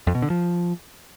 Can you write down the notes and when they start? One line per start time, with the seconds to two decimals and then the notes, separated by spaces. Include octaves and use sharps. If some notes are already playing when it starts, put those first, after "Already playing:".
0.07 F2
0.15 B2
0.22 D3
0.30 F3